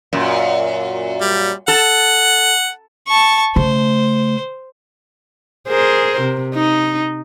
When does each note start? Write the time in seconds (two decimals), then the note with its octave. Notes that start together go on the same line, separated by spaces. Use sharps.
0.13 F#2 A#2
1.21 G3
1.68 A4 F#5
3.08 A5 C#6
3.56 C#3 A3 C5
5.69 G#4 A#4 C5
6.21 C3
6.55 D#4